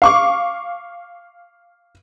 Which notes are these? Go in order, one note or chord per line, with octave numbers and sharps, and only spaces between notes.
F5 C#6 D6